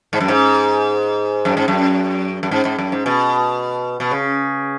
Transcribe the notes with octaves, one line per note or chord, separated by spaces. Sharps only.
G#2
F#2
G#2
F#2
G#2
F#2
F#2
G#2
G#2
F#2
G#2
B2
B2
C#3